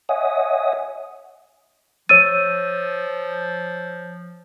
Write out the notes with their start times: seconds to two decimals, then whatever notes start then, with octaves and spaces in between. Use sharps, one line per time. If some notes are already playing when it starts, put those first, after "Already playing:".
0.09 C#5 D#5 E5 F#5 G#5 D#6
2.09 F3 C#5 E6 A6 D#7